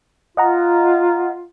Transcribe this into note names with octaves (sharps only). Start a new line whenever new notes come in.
F4 D#5 F#5 A#5